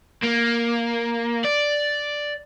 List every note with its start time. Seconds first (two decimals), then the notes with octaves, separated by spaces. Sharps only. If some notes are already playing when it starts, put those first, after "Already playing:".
0.22 A#3
1.44 D5